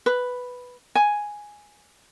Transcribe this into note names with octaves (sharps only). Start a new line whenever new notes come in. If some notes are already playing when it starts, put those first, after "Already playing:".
B4
G#5